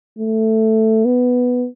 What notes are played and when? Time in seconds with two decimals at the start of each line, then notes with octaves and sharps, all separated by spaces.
0.18 A3
1.05 B3